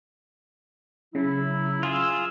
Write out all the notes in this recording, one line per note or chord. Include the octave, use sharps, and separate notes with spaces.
C#3 F#3 E4
F4 G#4 E6